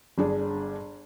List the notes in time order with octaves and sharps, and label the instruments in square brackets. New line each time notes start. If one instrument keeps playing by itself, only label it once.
[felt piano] G1 D4 G#4